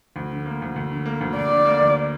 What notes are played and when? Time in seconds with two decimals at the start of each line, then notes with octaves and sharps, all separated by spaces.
0.16 D2
0.32 D3
0.46 A#3
0.62 D2
0.76 D2
0.91 D3
1.06 A#3
1.21 D2
1.36 D2 D5
1.51 D3
1.65 A#3
1.81 D2